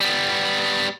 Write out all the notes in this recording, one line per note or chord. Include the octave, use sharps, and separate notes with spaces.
G3 B3